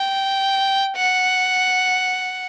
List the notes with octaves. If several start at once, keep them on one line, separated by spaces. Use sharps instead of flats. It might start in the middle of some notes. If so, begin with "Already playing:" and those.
Already playing: G5
F#5